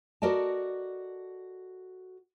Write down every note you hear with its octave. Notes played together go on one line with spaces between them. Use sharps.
F#4 A4 A#4 D5 D#5 A5